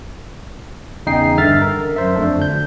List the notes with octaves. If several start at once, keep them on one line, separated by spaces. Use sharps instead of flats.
E2 C#3 D#4 G#4 G5 C7
G2 D3 E5 F6 A6
A#4
F#2 C5 E5
F2 A3 D4
D2 G6